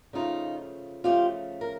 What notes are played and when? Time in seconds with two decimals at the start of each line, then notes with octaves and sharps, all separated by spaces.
0.13 C#3 F3 A3 D#4 F4
1.04 C#3 F3 A3 F4 G4
1.61 A#4